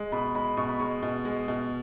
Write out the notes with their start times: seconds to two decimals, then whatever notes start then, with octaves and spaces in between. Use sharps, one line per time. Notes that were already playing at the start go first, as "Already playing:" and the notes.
Already playing: G#3
0.12 B2 B5
0.35 G#3 B5
0.57 B2 C#6
0.69 B5
0.80 G#3 C#6
1.03 B2
1.25 G#3
1.48 B2